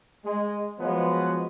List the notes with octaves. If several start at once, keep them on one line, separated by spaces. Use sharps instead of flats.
G#3
F3 F#3 G#3 B3